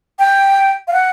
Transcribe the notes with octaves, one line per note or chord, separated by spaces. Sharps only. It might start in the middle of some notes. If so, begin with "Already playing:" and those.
G5
F5
F#5